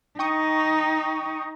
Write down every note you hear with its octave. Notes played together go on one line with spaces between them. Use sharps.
D#4 G5 C#6 D#6